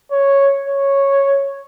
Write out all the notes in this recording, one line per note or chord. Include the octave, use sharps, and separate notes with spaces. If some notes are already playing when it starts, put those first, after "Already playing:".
C#5
C#5